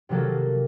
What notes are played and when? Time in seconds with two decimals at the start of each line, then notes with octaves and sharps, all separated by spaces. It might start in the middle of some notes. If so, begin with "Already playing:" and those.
0.09 C3 D#3 F#3 A#3 A4